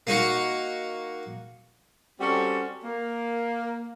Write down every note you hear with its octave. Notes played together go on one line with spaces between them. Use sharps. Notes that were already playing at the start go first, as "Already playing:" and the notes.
A#3 D#4 F#4
G3 C4 C#4 F#4 A4
A#3